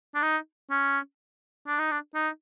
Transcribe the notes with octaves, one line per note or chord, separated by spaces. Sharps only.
D4
D#4
C#4
D4
D#4
D4
D#4